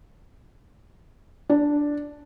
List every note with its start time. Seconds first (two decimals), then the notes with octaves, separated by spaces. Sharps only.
1.49 D4